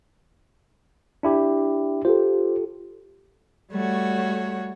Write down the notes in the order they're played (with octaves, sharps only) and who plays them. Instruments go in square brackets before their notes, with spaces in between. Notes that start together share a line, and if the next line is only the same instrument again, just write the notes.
[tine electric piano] D4 E4 G4
[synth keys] F4 G4 A4 [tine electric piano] C5
[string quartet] G3 A3 F#4 C#5